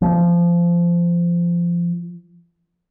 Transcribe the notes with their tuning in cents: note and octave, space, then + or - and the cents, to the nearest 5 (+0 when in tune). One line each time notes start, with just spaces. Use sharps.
F3 -20